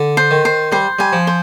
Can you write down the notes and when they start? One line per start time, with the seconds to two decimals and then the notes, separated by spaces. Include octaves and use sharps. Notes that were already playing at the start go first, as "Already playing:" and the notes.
Already playing: D3
0.17 C5
0.31 D#3
0.45 C5
0.72 G3 C5
0.99 G3 G#5
1.13 F3
1.27 C5